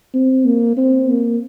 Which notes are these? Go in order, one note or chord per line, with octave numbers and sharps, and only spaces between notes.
C4
A#3
C4
A#3